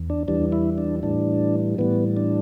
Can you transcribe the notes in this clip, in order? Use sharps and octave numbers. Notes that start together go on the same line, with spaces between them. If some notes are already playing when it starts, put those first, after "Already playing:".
Already playing: E2
D4
E2 E3 G3 D4
E4
D4
A2 E3 G3 D4
A2 E3 G3 B3
D4